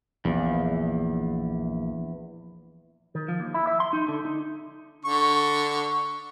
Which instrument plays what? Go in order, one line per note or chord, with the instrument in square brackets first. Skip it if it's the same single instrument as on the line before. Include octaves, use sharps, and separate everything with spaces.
[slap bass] A#1 [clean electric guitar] E2
[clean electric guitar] D#3
F3
D#2
E4
E5
C6
D#4
D3
D#4
[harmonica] D3 C#6